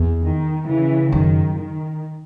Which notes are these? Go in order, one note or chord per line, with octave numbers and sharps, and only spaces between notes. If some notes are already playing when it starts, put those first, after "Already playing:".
Already playing: E2
D#3
C#3 E3
F#2 D#3
D#3